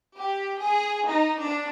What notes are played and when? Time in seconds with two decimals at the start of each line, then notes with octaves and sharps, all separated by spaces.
0.17 G4
0.61 G#4
1.07 D#4
1.41 D4